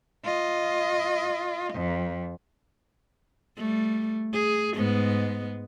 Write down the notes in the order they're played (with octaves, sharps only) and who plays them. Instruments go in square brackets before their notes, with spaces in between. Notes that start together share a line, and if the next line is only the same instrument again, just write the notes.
[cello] F4 D#5
F2
[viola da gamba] G3 A3
G#4
G#2 G#3 B3